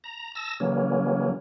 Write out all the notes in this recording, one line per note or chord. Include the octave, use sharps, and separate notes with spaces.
A#5
A5 E6 A#6
C#3 E3 F#3 G3 A#3 C#4